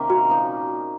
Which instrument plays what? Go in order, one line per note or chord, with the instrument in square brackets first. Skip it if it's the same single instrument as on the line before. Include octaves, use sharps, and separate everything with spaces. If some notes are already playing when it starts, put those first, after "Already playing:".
Already playing: [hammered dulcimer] C3 D#3 A#3 C#4 D#4
[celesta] F#4
[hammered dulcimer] A#2 F3 A#3 D#4